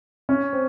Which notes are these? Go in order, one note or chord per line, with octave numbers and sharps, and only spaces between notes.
C#4
C4